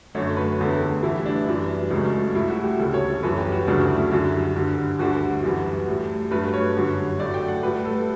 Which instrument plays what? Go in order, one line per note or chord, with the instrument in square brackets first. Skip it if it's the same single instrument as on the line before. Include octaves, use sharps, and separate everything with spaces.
[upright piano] F#2 D3 A3 C#5
B4
E2 D3 A3
G4
A2 E3 G3 E4
D4
F#2 E3 G3
C#2 C#3 F#3 A3
A2 G3 E4
F#4
G4
D2 C#3 G3 A4
C#5
A4
F#2 E3 G3 B4
G4
F#4
D2 C#3 F#3 A3 D4
E4
F#2 D3 G3
G2 D3 G3
D2 D3 G3 F#4
F#2 E3 G3
A2 G3
G2 F#3 A3 B4
C#5
F#2 D3 G3
A2 F#3 A3 D5
G5
F#5
A2 G3 B4
A4